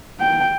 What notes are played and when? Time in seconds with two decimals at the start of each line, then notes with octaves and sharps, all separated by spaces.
0.21 G5